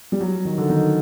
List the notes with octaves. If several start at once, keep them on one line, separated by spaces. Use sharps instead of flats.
G3
F#3
D#3
D3
D#3